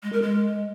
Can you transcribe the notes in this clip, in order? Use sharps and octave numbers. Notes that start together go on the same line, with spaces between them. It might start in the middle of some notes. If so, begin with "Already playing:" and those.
G#3
A#4
G#3